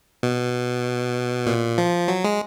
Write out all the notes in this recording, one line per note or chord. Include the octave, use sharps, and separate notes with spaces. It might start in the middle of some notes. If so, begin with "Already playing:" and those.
B2
A#2
F3
F#3
G#3